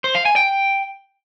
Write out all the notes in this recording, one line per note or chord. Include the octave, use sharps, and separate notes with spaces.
C5
F5
G#5
G5